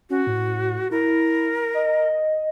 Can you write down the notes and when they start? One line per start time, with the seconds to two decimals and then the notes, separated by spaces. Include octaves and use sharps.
0.10 C#4 F#4
0.27 A2
0.91 E4 A#4
1.74 D#5